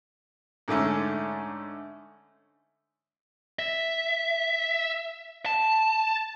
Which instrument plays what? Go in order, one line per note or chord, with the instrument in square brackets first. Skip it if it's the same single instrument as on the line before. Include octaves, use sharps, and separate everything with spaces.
[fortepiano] G#2 D3 A3 C#4
[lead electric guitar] E5
A5